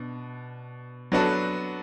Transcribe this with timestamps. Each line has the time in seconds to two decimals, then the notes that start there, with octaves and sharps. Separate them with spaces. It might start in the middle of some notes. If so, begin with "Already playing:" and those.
Already playing: B2 D4
1.12 F#3 B3 D4 F#4 A4